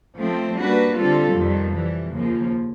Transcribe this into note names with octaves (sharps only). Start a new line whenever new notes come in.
F3 A3 C4
G3 A#3 D4 F#4 B4
D3 G3 C4 F4 A4
F2 C3 D#3 G3
C3 E3 G3
D#2 C#3 F3 A#3